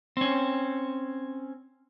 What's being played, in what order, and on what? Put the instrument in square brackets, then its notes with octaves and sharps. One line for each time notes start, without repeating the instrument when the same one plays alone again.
[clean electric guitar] C4 C#4